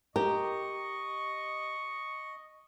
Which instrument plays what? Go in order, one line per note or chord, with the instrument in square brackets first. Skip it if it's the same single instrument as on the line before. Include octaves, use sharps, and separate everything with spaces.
[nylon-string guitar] G4 [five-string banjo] A#4 [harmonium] D#5 [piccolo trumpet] C#6